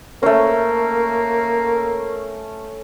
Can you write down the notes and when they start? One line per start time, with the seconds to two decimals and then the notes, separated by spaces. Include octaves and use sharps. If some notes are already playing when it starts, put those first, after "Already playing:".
0.23 A3 A#3 C#4